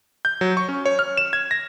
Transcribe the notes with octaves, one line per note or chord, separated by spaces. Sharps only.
G6
F#3
C#6
C#4
C#5
F6
E7
G#6
A#6